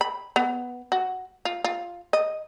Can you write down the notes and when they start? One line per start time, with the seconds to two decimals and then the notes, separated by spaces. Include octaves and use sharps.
0.01 B5
0.36 B3
0.92 F#4
1.45 F4
1.64 F4
2.13 D#5